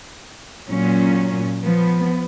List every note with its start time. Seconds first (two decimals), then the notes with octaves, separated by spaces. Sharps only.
0.68 A#2 F#3 C#4
1.62 F3 B3